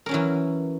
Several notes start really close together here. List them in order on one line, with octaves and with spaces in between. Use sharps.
A#4 C#4 F#3 E3